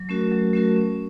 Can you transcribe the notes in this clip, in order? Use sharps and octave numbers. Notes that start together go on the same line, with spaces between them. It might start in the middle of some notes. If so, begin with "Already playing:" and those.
Already playing: F#3
A3 C#4 F#4 A#4
F#3
A3 C#4 F#4 A#4
C#4